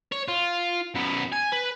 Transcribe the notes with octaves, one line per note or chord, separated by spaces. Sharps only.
C#5
F4
F#2 B3
G#5
B4